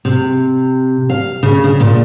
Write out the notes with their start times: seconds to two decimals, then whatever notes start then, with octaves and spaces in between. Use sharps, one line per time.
0.05 C3
1.09 F5
1.43 C#3
1.64 C#3
1.80 A#2